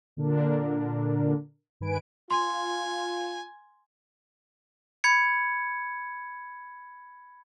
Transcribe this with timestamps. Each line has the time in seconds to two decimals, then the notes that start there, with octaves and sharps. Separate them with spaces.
0.17 A#2 D3 D4 A#4
1.80 G2 D#3 B4 G#5 D7
2.31 F4 G#5 C6
5.04 B5 G#6 C#7